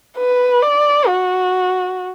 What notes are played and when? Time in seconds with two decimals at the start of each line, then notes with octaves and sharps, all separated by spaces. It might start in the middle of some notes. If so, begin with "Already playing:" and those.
0.17 B4
0.62 D5
1.07 F#4